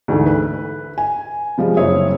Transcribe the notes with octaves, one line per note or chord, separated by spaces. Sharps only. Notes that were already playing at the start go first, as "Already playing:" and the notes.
D2 G#2 E3 A3
B4
G#5
C3 F3 G3 G#3
F#1 C4 C#5 E5 D#6